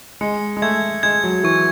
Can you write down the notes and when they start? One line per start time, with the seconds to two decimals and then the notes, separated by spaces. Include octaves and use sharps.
0.21 G#3 C#7
0.57 G#3
0.62 A3 G#6
1.03 G#3 G#6
1.24 F#3
1.44 E3 C#6